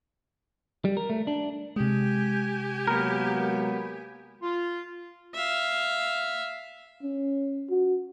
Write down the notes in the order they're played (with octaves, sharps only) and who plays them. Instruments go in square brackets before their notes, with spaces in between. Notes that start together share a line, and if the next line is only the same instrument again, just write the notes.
[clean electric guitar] G3
A#4
A3
D4
[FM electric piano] C3 G#3 [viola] G4 G#5
[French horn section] F#3 A#3 [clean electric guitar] B3 A#4
[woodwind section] F4
[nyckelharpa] E5 F5
[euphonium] C#4
F#4